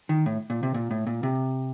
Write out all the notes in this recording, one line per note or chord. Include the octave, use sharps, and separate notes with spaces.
D#3
A2
A#2
C3
A#2
A2
A#2
C3